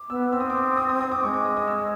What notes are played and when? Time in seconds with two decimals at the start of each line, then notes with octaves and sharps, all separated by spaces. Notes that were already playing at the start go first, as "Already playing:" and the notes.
Already playing: D6
0.10 B3 E6
0.32 C4 E6
0.40 D#6
0.50 D6
0.57 D#6
0.77 D#6
0.89 D#6
1.01 D#6
1.11 D6
1.23 G#3 C#6
1.34 D6
1.45 D#6
1.57 D#6
1.68 E6